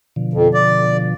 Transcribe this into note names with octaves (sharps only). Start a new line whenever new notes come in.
B2 D3 F3
F2
D5